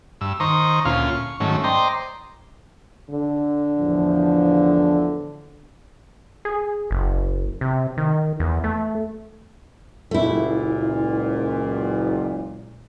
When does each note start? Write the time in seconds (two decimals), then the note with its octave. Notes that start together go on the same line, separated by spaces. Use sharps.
0.21 G2 E6
0.40 D#3 C5 A#5 C#6 D#6
0.85 D2 A#2 C#4 F4 F6
1.10 C#6
1.40 G#2 D#3 F#3 A3 C#4
1.64 C5 D5 D#5 G5 A#5 C6
3.10 D3
3.79 E2 A2 F3
6.45 G#4
6.91 F#1
7.61 C3
7.97 D#3
8.40 E2
8.64 A3
10.11 F#1 C#2 A#2 A3 E4